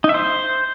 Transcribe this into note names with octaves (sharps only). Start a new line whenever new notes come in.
D#4
E5
C5